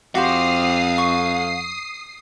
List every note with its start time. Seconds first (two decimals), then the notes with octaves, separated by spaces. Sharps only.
0.15 F2 F#4 G4 C5 F5 D#6 C7
0.98 C#6